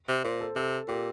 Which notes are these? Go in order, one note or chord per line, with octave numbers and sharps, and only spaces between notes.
C3
A#2 C5
A4
C3 A4
A#2 G4